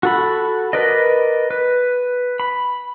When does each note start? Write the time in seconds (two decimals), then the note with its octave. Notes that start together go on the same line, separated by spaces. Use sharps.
0.03 F#4 A4 B5
0.73 A#4 B4 D5 D#5
1.50 B4
2.40 B5